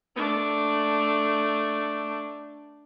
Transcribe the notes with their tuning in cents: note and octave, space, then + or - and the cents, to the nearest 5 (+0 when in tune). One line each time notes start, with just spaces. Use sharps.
A3 +0 D4 +0